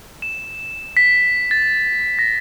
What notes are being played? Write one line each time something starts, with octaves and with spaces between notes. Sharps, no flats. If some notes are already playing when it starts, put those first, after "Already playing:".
E7
B6
A6
A#6